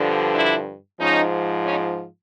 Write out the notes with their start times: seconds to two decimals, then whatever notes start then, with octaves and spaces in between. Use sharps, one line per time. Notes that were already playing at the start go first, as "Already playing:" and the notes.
Already playing: G2 D3 F3
0.35 D4 E4
1.00 G#2 F3 C#4 D#4
1.66 C#4 D#4